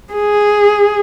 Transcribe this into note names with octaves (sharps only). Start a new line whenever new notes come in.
G#4